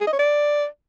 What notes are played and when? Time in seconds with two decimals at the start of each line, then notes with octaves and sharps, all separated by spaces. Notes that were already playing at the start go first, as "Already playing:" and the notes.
0.01 G#4
0.07 D#5
0.13 C#5
0.19 D5